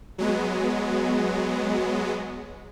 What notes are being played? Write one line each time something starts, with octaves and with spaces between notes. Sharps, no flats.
F#3 G#3 B3